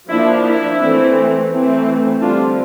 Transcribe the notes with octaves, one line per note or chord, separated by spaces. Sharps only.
F3 A#3 D4 E4
E4
E3 A3 C4
E3 A3 C4
D3 G3 C4 D4 F4